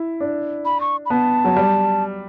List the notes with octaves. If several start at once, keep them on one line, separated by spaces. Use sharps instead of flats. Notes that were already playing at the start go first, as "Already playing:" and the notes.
Already playing: E4
D4
B5
C#6
B5
B3 A5
F#3
G3